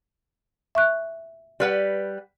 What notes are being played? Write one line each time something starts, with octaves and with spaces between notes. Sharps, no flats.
E5 C#6 F#6
G3 B4 F#5